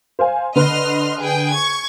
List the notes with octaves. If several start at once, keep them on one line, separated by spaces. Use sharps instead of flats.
C5 F5 G#5
D3 B4 D#5 B5 C6 F6
G#4 G5
C#6 G#6